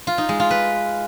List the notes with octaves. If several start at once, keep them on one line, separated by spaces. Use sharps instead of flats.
F4
D#4
G#3
F4
B4